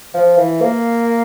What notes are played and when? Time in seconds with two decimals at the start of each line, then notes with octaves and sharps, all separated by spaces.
0.14 F3
0.37 E3
0.61 A#3